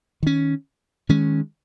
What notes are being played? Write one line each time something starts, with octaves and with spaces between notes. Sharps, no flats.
D#3 C#4
D#3 G#3 C#4